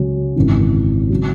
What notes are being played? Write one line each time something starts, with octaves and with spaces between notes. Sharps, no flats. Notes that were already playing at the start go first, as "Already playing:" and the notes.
Already playing: C#2 C#3 F#3 C#4 F#4
G#1 F#2 C#3 E3
C#3 F#3